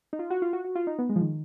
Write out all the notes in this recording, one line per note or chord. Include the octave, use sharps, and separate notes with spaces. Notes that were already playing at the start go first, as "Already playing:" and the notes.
D#4
F4
F#4
F4
F#4
F#4
F4
D#4
B3
G#3
F3
D#3